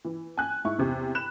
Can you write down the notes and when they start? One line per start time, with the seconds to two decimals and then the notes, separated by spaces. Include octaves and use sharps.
0.05 E3
0.37 G#5 F#6
0.65 G#2 E4 C#6
0.78 E2 C3
1.15 B5 F#6 E7